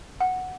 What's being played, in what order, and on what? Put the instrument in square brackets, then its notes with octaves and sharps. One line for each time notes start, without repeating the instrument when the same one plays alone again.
[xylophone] F#5